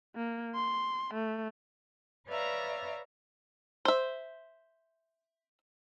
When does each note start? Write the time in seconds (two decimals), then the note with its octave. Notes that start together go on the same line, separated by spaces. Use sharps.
0.16 A#3
0.55 C6
1.14 A3
2.27 B4 C#5 D5 E5 F5 A#5
3.85 C5 E5